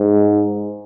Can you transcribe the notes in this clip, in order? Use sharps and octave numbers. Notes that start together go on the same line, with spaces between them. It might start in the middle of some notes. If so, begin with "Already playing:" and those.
Already playing: G#2